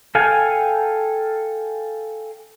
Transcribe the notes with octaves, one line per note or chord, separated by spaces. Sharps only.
A4 F5 G5 G#5